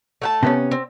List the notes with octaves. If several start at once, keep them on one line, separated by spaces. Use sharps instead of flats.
A3 F#5 A5
C3 B3 C#4
C4